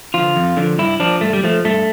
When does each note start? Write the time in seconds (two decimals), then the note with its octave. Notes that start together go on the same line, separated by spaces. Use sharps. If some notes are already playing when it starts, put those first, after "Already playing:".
0.14 D3 F3 F4
0.36 F2
0.57 D3 F3
0.79 G2 E4
1.00 F3 D4
1.21 G2 A3
1.33 G3
1.43 F3 A3
1.65 G2 A3